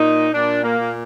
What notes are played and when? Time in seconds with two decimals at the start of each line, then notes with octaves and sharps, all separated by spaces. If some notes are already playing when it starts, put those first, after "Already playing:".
Already playing: A#2 D#4
0.34 A#2 D4
0.63 A#3
0.78 A#2